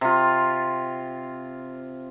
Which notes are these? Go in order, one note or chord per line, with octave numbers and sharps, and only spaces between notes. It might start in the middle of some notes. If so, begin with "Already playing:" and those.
C3 F4